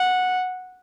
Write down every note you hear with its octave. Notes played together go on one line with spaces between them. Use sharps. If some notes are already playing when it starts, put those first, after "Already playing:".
Already playing: F#5